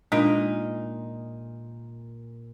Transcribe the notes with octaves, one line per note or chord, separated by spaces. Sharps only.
A#2 G#3 A#3 D4 D#4 F4